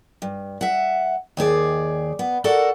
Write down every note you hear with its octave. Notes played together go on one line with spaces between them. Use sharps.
G2
E5 F#5
D#2 D#3 G#4 D5
B3
F#4 A4 A#4 D5 F#5